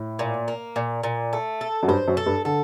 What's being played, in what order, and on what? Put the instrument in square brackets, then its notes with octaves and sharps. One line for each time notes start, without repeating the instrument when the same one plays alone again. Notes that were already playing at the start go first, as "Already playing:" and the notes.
Already playing: [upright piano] A2
[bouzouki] A#2
A#3
A#2
A#2
A3
A4
[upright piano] F#2
[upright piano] G2 [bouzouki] C5
[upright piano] F#2
[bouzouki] A4
[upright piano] G2
[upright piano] D3 [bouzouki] A4